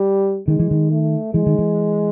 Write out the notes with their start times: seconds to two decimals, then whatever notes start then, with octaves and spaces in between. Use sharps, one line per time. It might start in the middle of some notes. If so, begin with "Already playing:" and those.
Already playing: G3
0.48 D#3 G#3
0.59 E3
0.71 D#3
0.91 A3
1.34 E3 G#3
1.46 D#3
1.58 E3